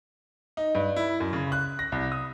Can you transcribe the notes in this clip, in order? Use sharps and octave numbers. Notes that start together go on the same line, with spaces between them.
D#4
G2
E4
F#2
C#3
F#6
A#6
C2
D#6